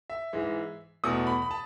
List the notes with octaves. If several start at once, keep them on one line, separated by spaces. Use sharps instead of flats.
E5
G#2 E3 G#3
E2 B2 A3 D#6
B5
B5
A5